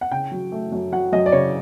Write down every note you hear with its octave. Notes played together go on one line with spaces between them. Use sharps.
F#5
C#3 G5
F#3
A3
F#2
F#3 F#5
F#2 D#5
D5
C#3 C#5